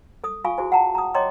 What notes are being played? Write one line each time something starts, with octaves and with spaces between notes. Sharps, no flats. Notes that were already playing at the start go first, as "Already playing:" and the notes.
A4 D#6
F4 F5 G#5 C#6
E4 F#4 G#4 C5 G#5
F#5 G5 A5 A#5
A#5 D#6
C#5 D#5 G5 A#5 C6 D6